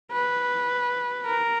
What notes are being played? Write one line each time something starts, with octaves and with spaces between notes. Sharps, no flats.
B4
A#4